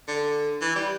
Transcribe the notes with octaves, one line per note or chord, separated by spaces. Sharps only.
D3
E3
G3